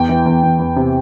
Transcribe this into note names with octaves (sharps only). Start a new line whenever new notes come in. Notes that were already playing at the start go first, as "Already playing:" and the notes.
Already playing: E2 G5
E3
E2
E2
E2
C3